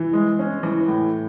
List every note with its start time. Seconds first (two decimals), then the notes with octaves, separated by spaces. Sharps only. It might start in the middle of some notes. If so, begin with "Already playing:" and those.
Already playing: E3
0.13 G#3
0.39 C#4
0.63 E3
0.88 A2